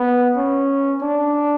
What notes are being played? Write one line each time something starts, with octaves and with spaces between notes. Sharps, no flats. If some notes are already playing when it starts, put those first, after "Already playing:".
Already playing: B3
C#4
D4